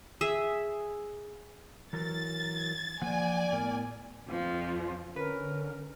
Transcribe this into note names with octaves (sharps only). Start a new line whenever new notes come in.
G#4 E5
E3 F#3 A#4 A6
F3 A#3 D5 F#5 G#5
A2 B3 A#4
F2 F3
D3 C#4 A#4 B4